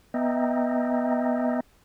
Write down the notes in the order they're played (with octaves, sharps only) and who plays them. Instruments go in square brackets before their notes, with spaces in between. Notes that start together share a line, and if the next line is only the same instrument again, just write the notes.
[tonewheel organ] B3 D#5 E5 G5 A#5